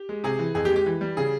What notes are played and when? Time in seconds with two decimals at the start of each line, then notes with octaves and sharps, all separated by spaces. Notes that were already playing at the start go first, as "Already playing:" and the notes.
Already playing: G4
0.09 G#3
0.24 C3 G#4
0.39 E3
0.55 F2 G#4
0.65 G4
0.70 G#3
0.76 G4
0.86 E3
1.01 G3
1.17 C#3 G#4